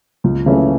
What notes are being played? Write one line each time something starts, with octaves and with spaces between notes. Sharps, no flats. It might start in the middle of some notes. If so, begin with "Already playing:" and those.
C#2
C#3 E3 A3 C#4